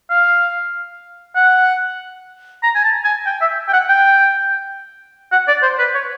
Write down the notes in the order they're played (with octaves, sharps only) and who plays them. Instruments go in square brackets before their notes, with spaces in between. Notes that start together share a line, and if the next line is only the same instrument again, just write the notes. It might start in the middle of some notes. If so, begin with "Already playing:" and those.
[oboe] F5
F#5
A#5
G#5
A5
G#5
G5
E5
G5
F#5
G5
F#5
D5
C5
B4
C#5